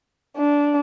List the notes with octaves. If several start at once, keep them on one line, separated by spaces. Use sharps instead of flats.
D4